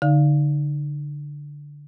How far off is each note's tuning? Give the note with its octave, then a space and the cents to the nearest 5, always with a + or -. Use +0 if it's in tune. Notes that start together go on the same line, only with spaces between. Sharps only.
D3 -10 D#4 +0 F5 +0